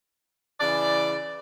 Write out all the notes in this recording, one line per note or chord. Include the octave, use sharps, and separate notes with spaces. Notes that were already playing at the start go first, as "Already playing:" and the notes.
C#3 E3 D5